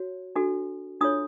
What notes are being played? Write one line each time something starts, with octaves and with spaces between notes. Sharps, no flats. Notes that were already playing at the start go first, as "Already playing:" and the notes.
Already playing: F#4 C#5
D4 F#4 A4
D4 F4 A4 C#5 D#6